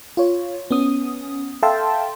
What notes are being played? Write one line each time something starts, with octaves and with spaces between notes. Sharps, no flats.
F4 C#5
B3 C#4 D#6
A4 E5 F5 G5 A5 C6